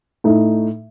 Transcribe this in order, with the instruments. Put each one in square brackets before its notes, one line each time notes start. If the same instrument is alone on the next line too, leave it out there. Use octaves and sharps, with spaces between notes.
[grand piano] A2 A3 D#4